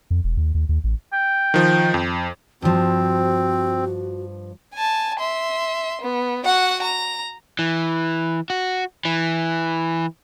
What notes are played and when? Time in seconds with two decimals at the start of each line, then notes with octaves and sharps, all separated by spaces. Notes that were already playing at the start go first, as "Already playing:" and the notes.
0.10 F2
0.24 E1
0.37 D#2
0.54 D#2
0.69 D#2
0.84 A1
1.13 G5
1.54 D#3 F3
1.94 F2
2.62 G2 F3 C4 F#4
4.74 G#5 A5
5.20 E5 C6
6.01 B3
6.45 F#4 F#5
6.82 A#5
7.59 E3
8.50 F#4
9.05 E3